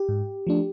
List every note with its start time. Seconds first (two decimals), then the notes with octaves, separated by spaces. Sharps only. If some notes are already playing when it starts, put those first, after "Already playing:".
Already playing: G4
0.09 G#2
0.47 F3 A3 D4